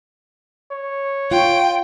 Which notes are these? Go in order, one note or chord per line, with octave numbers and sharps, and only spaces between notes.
C#5
F4 G5